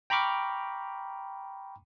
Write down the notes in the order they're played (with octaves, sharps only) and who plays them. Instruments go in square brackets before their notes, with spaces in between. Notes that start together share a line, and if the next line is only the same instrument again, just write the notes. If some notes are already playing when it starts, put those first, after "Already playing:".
[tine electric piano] G5 A#5 B5 C#6 D6 F6